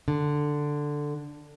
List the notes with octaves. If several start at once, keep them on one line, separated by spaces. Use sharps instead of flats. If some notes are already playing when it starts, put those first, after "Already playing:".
D3